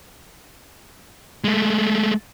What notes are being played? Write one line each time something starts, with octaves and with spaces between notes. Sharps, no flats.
G#3 A3